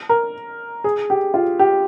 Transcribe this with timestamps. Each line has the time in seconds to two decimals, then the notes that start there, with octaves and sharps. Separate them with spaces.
0.09 A#4
0.84 G#4
1.10 G4
1.34 F4
1.59 G4